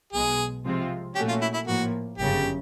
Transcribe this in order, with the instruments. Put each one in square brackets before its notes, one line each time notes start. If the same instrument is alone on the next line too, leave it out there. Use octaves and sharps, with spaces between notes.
[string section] B1 B2 G#3 [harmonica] G#4
[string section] C3 F3 G#3 C4 F4
[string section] A#2 F#3 A3 C#4 F#4 [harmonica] G4
[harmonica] F4
E4
E4
[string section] A2 F3 A#3 [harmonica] F#4
[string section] G1 F#2 C#3 [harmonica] G4